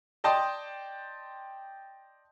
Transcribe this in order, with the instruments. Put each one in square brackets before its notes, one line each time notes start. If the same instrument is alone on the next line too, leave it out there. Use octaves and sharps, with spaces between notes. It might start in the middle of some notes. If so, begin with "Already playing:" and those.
[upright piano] D5 D#5 G5 A5 C6 D#6